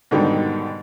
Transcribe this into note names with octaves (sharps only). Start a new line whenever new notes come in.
G#2 B2 D3 D#3 G3